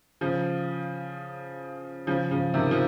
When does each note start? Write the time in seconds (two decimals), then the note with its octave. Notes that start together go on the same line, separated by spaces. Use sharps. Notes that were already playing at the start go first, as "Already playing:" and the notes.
0.21 C#3 F3
2.07 C#3 F3
2.31 C#3 F3
2.54 C3 D#3
2.71 F3